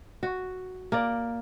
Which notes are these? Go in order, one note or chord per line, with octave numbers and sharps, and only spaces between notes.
F#4
A#3 D5